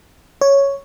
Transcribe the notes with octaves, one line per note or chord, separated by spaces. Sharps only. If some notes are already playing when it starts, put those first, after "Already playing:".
C#5